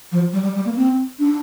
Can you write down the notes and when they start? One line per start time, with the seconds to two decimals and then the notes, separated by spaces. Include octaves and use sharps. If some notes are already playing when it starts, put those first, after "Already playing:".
0.12 F3
0.33 G3
0.43 G3
0.55 G3
0.65 A#3
0.76 C4
1.19 D4